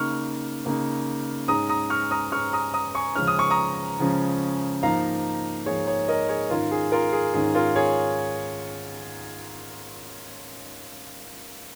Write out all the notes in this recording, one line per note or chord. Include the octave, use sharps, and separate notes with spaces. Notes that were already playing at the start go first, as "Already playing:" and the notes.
Already playing: C#3 A#3 D#4 C#6 F6
C#3 A#3 D#4
G#2 G#3 C#4 A#5 D#6
A#5 D#6
C#6 F6
A#5 D#6
G#2 G#3 C#4 C#6 F6
A#5 D#6
A#5 D#6
G#5 C#6
C#3 F3 G#3 C#4 F6
D#6
C#6
A#5 D#6
C#3 F3 G#3 C#4
G#2 F3 A#3 D#4 F5 A#5
G#2 F3 A#3 D#4 G#4 C#5
G#4 C#5
A#4 D#5
G#4 C#5
G#2 D#3 C#4 F4 A#4
G#4
F4 A#4
G#4
G#2 D#3 C#4 G#4
F4 A#4
G#4 C#5